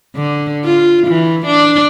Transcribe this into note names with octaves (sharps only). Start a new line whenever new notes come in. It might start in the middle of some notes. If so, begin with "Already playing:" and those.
D3
F4
E3
D4